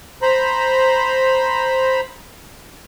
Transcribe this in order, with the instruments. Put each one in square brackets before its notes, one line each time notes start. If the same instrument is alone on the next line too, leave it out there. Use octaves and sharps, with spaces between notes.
[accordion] C5 A#5 B5